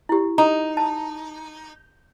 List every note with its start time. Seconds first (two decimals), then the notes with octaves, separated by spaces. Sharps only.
0.09 E4 G4
0.38 D#4 A#5
0.77 A5